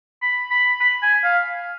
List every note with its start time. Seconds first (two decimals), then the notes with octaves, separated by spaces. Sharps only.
0.22 B5
0.51 B5
0.80 B5
1.03 G#5
1.24 F5